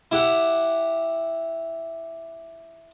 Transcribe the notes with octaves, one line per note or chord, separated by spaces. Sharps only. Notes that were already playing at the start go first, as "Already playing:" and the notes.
E4 G4 F#5